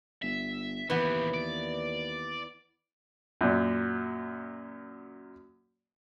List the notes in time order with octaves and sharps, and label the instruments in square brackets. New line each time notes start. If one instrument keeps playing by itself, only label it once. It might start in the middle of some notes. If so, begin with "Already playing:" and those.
[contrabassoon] G1 [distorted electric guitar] E5
[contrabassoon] D#2 [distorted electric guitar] C#3 G4 [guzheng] E3 B3
[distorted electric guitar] D5
[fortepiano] F#2 A#2